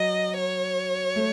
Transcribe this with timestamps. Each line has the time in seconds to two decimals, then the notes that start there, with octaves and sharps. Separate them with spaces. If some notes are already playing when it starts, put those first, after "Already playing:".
Already playing: F#3 D#5
0.38 C#5
1.16 A3